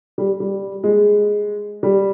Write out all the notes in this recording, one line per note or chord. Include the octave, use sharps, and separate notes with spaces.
G3
G3
G#3
G3